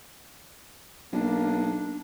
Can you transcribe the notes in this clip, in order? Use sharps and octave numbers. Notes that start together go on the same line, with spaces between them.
B1 A#3 D4